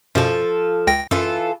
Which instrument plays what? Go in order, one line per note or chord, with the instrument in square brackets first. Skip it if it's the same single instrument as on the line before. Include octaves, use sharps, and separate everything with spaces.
[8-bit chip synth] F#2 B2 [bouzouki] F3 A4
[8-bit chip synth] C#2 G5 A#6
[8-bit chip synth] F#2 [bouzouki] E3 F4 A4